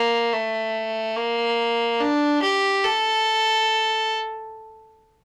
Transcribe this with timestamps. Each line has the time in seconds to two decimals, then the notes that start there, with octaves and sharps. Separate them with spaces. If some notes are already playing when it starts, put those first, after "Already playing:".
Already playing: A#3
0.33 A3
1.17 A#3
2.00 D4
2.42 G4
2.84 A4